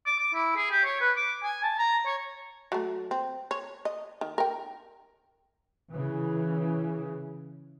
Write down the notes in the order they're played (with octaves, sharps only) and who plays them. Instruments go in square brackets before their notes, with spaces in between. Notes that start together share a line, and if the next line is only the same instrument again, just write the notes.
[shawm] D6
D6
E4
G#4
G4
C#5
B4
D6
G#5
A5
A#5
C#5
[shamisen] F#3 A3
C4
C#5
D#5
D#3
A#4 G5
[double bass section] C#3 E3